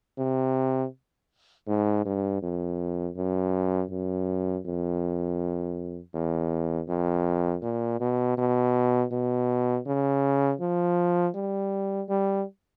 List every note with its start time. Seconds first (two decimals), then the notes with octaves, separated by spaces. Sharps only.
0.18 C3
1.67 G#2
2.05 G2
2.42 F2
3.16 F#2
3.91 F#2
4.65 F2
6.14 E2
6.88 F2
7.62 A#2
8.00 B2
8.38 B2
9.12 B2
9.86 C#3
10.61 F3
11.35 G3
12.09 G3